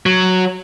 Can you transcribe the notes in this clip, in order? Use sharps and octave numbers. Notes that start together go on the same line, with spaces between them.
F#3